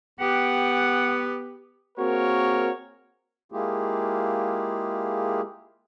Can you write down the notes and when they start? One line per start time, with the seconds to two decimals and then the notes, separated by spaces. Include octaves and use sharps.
0.20 B3 G4 F#5 G5
1.98 A#3 C4 F#4 G#4 A#4 C#5
3.52 G#3 A#3 E4 F4 G4 G#4